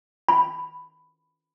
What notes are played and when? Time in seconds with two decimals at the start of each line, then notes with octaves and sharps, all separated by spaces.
0.29 B5